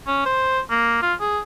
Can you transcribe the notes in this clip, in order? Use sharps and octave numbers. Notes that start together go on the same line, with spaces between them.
C#4
C5
A#3
F4
G#4